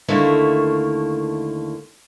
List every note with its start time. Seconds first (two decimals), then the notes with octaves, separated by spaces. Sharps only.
0.08 D#2 D3 A3 A#3 E4 C#5